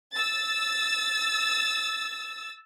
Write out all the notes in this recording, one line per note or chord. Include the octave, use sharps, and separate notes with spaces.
E6 A6